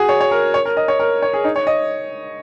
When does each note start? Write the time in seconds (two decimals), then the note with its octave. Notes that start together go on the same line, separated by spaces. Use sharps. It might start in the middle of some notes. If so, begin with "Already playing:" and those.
Already playing: F#4 G#4
0.09 C#5
0.21 C#5
0.31 A#4
0.54 C#5
0.65 A#4
0.77 D#5
0.88 C#5
0.99 A#4
1.22 C#5
1.33 G#4
1.44 D#4
1.56 C#5
1.67 D#5